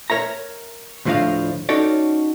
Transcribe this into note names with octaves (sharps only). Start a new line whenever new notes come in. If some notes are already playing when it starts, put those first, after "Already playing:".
A#4 C#5 E5 A#5
D2 A2 F3 D4 D#5 F5
C#4 D#4 F#4 A4 C#5 D5